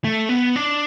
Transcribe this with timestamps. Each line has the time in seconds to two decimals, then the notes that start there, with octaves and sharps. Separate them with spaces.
0.04 A3
0.29 B3
0.56 D4